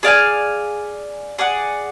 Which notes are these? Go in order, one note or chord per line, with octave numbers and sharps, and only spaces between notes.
G#4 D5 F5 G#5
G#4 D5 F#5